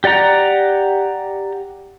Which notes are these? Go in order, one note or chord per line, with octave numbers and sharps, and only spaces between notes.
G4 D5 F#5 A#5